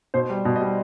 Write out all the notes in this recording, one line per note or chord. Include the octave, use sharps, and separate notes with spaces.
B2 C5
G3
B2
D#5
G3